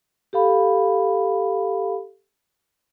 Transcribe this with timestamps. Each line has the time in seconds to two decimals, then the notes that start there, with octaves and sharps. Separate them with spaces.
0.33 G4 A4 F5 B5